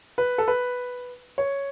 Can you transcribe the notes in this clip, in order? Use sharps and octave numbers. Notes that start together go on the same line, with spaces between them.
B4
A4
B4
C#5